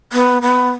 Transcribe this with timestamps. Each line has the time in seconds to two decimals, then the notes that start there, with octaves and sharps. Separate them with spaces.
0.13 B3
0.42 B3